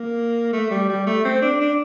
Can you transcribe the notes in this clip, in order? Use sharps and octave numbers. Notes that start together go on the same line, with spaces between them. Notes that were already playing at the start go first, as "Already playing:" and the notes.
Already playing: A#3
A3
G3
G3
A3
C4
D4
D4